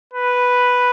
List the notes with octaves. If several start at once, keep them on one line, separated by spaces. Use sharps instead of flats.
B4